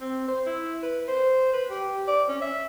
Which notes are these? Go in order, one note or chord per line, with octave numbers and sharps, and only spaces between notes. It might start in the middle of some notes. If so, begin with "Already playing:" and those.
C4
C5
E4
B4
C5
B4
G4
D5
C#4
E5